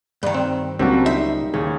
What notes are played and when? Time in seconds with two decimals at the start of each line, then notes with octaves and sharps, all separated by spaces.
0.23 G2 D#3
0.34 C4
0.79 C#2 F#3 G3 A#3 C4 D4 F4 F#4
1.06 D#4 C5 E5
1.54 D#2 C#3 C#4 C#5